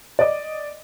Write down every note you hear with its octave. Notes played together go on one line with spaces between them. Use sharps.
D5 D#5